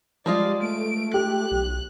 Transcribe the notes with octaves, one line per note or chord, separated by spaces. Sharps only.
F3 G3 G#3 F4 D5
A3 D7
G4 F#6
B1